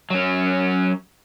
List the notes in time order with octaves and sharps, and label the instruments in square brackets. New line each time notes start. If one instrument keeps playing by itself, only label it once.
[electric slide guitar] F#3 C#4